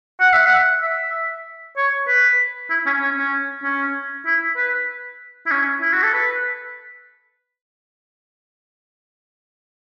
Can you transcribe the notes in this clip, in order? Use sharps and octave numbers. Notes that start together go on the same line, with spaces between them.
F#5
E5
F#5
E5
C#5
B4
E4
C#4
C#4
C#4
C#4
E4
B4
E4
C#4
E4
F#4
A4
B4